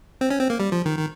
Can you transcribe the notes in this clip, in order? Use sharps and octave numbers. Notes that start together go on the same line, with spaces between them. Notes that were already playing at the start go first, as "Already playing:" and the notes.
C4
C#4
C4
A#3
G3
F3
D#3
D#3